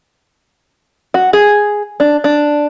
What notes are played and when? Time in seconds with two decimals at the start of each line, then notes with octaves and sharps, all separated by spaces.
1.14 F#4
1.33 G#4
2.00 D4
2.24 D4